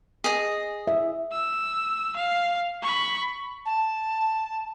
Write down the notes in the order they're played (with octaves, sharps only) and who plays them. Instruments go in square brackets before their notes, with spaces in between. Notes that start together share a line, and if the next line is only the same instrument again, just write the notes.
[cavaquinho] G#4 D#5
[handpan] E5
[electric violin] E6
F5
B5 C#6
[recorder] A5